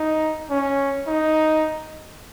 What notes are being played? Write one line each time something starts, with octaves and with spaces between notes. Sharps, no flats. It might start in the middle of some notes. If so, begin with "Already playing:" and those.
Already playing: D#4
C#4
D#4